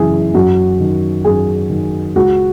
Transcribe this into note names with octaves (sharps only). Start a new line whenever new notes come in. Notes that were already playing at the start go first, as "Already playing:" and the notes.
Already playing: F#2 C#3 E3 G#4
F#2 F#4
D#3
F#2 G#4
D#3
C#2 F#4